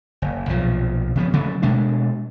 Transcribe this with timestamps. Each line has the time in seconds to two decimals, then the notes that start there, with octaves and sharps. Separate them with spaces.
0.22 F#1
0.49 B1 A#2 F3
1.15 C#3 F3 B3
1.33 C#3 F#3 A3
1.62 B2 G#3 A3 D4